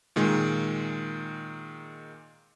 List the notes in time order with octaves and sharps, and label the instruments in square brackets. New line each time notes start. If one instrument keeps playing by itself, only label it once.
[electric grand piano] A#2 D#3 G#3